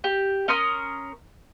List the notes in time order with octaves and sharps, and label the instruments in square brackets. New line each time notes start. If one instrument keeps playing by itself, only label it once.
[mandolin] G4
C#4 A#4 C6 D#6